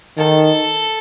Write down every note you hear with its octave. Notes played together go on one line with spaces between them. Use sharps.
D#3 A4